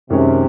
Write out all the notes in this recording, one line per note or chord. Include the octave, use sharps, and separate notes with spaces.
F#2 C3 D#3 G#3 C#4